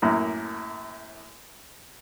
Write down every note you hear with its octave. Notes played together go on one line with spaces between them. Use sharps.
F#2 A2 A#3